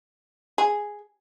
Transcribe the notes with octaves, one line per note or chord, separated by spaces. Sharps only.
G#4